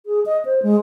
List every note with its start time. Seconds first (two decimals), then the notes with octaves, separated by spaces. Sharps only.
0.06 G#4
0.26 D#5
0.45 C5
0.63 G#3